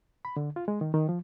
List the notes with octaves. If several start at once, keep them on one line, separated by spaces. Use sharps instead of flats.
B5
D3
F4
G#3
D#3
D#3
F3